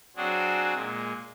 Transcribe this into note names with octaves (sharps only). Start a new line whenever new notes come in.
F#3 C4 D4 F#4 G#4 C5
A#2 G#3